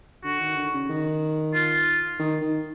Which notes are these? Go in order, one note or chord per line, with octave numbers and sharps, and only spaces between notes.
D3 F#4
D#3
D3
C#3
D#3
F4
D#3
D#3